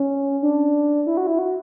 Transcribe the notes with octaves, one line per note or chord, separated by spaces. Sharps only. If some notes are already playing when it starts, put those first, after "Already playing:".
Already playing: C#4
D4
E4
F#4
E4
F#4